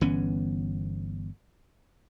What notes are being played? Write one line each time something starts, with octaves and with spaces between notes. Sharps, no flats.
G1 E3 B3 C#4